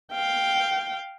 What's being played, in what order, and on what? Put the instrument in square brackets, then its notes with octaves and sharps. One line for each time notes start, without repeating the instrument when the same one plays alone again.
[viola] F5 G5